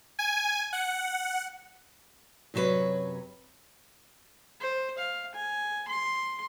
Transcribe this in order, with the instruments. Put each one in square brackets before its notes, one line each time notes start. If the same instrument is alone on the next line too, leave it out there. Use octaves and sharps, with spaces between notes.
[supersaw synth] G#5
F#5
[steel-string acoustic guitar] F#2 C3 F#3 D4 B4 C#5
[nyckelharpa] C5
F5
G#5
C6